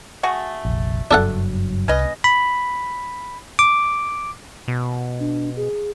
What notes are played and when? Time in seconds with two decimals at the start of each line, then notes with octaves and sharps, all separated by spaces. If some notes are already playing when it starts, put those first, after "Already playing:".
0.23 A3 F#4 G#4
0.65 F1 A#1
1.11 F#1 G2 F#3 D4 A4 F#5
1.88 C2 C#4 B4 D#5
2.24 B5
3.59 D6
4.68 B2
5.20 D4
5.56 G#4